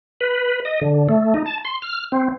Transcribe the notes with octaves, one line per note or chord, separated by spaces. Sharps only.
B4
D#5
D3
A3
D#4
A5
C6
F6
C4